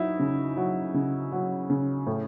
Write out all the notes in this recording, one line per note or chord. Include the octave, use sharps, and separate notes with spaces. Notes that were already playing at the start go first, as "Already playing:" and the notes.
Already playing: F#3 D#4 E4
C#3
F#3
C#3
F#3
C#3
A2